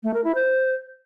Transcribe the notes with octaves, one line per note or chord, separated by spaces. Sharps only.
A3
A#4
E4
C5